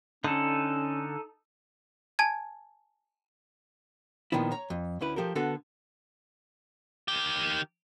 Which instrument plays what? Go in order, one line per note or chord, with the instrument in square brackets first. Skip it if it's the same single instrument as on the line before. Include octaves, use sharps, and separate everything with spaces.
[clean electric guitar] D3 [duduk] C#4 [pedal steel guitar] D#4 A4
[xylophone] G#5 A5 G#6
[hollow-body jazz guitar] A#2 D#3 F3 B3 E4
C#5 A#5
F2
D2 C#4 E4 B4
F3 G4 A4 A#4
D3 B3 F#4 A4
[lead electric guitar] D#3 G4